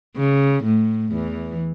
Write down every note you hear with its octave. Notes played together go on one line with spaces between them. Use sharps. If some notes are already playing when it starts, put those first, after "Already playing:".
C#3
A2
E2 E3